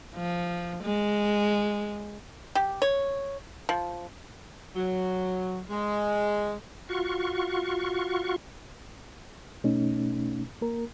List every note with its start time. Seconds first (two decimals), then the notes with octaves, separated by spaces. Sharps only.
0.15 F3
0.83 G#3
2.55 G4
2.82 C#5
3.69 F3
4.76 F#3
5.70 G#3
6.89 F4 F#4 C#6
9.64 B2 A3 C#4 D#4
10.61 A#3 A#4